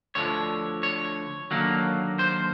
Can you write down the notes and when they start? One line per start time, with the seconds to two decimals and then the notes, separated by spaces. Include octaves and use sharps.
0.15 D2 D3 F3 C#5
0.83 C#5
1.51 D#2 D3 F#3 A#3
2.19 C5